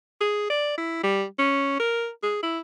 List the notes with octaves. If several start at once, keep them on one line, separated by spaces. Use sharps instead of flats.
G#4
D5
E4
G3
C#4
A#4
G#4
E4